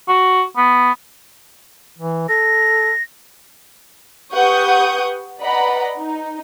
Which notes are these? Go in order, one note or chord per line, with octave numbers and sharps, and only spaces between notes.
F#4
B3
E3
A4 A#6
G4 B4 F#5 C#6 D#6 G6
B4 D5 D#5 F#5 A#5 B5
D#4